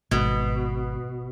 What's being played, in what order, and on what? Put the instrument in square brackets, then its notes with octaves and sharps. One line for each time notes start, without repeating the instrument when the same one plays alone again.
[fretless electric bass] G#1 [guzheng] B2